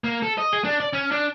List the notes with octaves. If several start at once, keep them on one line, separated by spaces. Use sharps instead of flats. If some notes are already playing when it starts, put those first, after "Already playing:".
A#3
A4
D#5
G#4
D4
D5
C#4
D4